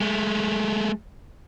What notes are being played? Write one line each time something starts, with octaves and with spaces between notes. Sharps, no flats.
G#3 A3